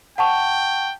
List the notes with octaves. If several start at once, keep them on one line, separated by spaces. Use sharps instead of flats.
F#5 G5 A5 C#6